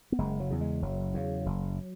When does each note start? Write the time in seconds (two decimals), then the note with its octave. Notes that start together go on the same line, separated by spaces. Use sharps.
0.12 B3
0.19 F#1 G#3
0.40 F#3
0.50 E2 C#3
0.61 G#3
0.82 F#1 F#3
1.14 E2 C#3
1.46 F#1